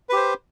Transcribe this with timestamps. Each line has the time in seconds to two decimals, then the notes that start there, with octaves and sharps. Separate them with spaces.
0.09 B4
0.13 G4
0.16 C5